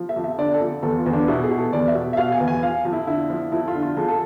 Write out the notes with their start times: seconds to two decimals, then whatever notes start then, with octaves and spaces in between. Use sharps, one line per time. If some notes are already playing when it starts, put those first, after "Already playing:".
Already playing: F3
0.09 E5
0.16 F2
0.24 E5
0.38 D3 D5
0.54 A4
0.60 F2
0.83 E2 A4
0.98 F4
1.06 E2
1.13 D4
1.28 B2 E4
1.43 G#4
1.50 B2
1.58 A4
1.73 E2 D5
1.88 E5
1.95 B2
2.13 E5
2.17 B2 F5
2.32 G#5
2.40 E2
2.48 G#5
2.62 F3 F5
2.85 F2
2.93 E4
3.07 D3 E4
3.30 F3
3.52 F2 E4
3.68 F4
3.75 D3
3.83 F4
3.97 F2 G#4
4.08 A4